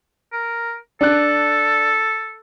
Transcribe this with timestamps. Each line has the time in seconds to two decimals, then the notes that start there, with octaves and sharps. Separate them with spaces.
0.33 A#4
1.01 D4 A4 F#6